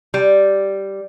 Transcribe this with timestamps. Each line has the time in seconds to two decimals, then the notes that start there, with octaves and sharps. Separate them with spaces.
0.14 G3